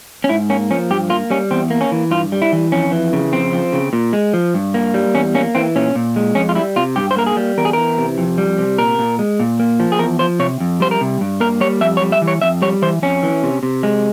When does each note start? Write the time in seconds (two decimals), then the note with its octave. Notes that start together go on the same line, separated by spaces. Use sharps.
0.24 C#4
0.29 G#2 E4
0.49 A#3 C#4
0.70 F3 C#4
0.91 G2 G4
1.10 A#3 F4
1.30 G3 C#4
1.51 E2 C4
1.70 A#3
1.81 C#4
1.92 E3
2.11 G2 F4
2.32 G3
2.42 E4
2.52 E3
2.72 F2 C#4
2.92 E3
3.13 C#3
3.33 F2 C4
3.53 F3
3.73 C#3
3.93 A#2
4.13 G#3
4.34 F3
4.54 G2
4.74 A#3
4.94 G3
5.14 E2 C#4
5.35 A#3 C#4
5.55 E3 C4
5.76 A#2 C#4
5.95 A#2
6.16 G#3
6.35 F2 C#4
6.49 F4
6.55 G3 E4
6.76 C3 F4
6.96 G2 G4
7.11 C5
7.17 A#3 A#4
7.26 G#4
7.37 G3
7.58 E2 A#4
7.65 G#4
7.73 E3 A#4
7.98 C3
8.18 F2
8.38 G3
8.58 C3
8.79 A#2 A#4
8.99 A#2
9.19 G#3
9.40 A#2
9.59 A#3
9.80 F3
9.92 G#4
9.99 E2 A#4
10.19 F3 C5
10.39 C3 C#5
10.61 F2
10.80 G3 C5
10.91 A#4
11.01 C3
11.21 G2
11.40 A#3 A#4
11.60 G3 C#5
11.81 F2 E5
11.97 C#5
12.01 G3
12.12 E5
12.22 E3
12.28 C#5
12.42 F2 E5
12.62 G3 C#5
12.82 E3 C5
13.02 F2 C#4
13.23 E3
13.43 C3
13.63 C3
13.83 G#3